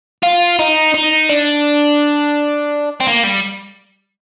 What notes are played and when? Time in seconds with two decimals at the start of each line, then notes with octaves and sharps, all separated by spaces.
0.23 F4
0.59 D#4
0.95 D#4
1.30 D4
3.00 C4
3.07 A#3
3.23 G3